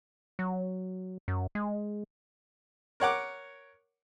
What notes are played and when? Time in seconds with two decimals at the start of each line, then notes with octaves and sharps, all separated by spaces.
0.39 F#3
1.28 F#2
1.55 G#3
3.00 A#4 C#5 F#5 D6